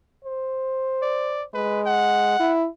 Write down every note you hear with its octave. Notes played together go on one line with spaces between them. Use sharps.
C5
D5
G#3 B4
F#5
E4